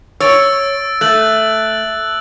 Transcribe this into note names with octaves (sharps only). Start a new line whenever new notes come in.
C#5 E6 A6 D7
A3 F#6 A6 F#7